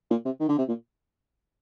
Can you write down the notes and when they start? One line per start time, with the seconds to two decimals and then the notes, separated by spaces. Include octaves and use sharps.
0.11 A#2
0.25 C3
0.40 D#3
0.48 D3
0.58 C3
0.68 A#2